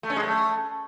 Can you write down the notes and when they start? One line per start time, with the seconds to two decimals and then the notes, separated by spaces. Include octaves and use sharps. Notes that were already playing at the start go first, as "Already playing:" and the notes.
0.03 A3
0.10 C#4
0.16 G#3
0.23 A3